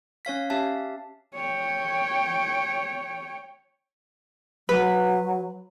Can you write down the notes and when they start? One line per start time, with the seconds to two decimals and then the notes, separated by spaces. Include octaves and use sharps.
0.25 C#4 C#5 F5 B6
0.50 C#4 G4 E5 F5 A5
1.35 C#5 G5
4.69 F#3 B4